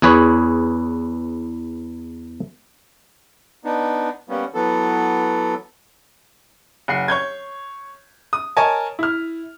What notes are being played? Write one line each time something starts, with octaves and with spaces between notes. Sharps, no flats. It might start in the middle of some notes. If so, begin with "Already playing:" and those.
E2 E4 G#4 B4 C#5
B3 D4 D#4
G3 A#3 B3 C#4
E3 F#3 B3 A4
F#1 F#5 C7
C#5 G6 G#6
D#6
A#4 C#5 D#5 G#5 A5
E4 F6